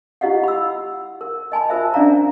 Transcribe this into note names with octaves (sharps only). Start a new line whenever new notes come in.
E4 F4 G4 D#5 F5 F#5
B5 E6
A#4
D#5 G#5 A5 B5
F4 A#4 C5 E5
C#4 D4 D5 E5 F5 A#5